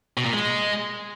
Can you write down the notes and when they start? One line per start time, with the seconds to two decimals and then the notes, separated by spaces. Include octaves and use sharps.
0.17 B2
0.25 A#2
0.33 G#3